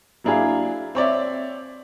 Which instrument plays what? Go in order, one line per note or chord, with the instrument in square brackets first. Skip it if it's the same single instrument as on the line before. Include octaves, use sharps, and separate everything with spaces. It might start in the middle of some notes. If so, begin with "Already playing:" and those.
[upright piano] F#3 A#3 D4 E4 G#4 F5
C4 C#5 D5 E5